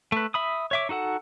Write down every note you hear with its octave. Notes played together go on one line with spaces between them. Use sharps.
A3 B4
E5 B5 D#6
C#5 E5 D6
D#4 F#4 A4 F#5